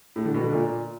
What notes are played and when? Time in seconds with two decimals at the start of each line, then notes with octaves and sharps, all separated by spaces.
0.16 A2
0.25 D3
0.34 B2
0.44 D3
0.53 A#2